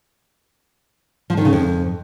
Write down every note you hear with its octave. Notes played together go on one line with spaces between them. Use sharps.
F3
D#3
C#3
F2